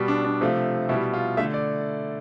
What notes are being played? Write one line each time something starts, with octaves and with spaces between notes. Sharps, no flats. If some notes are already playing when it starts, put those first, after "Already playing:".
Already playing: B2 G3
D4
D4
C3 F3 A3
B2 G3 E4
F4
D3 A3 E5
D5